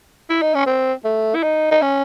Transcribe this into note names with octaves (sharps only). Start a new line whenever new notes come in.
E4
D#4
C#4
C4
A3
E4
D#4
D#4
C#4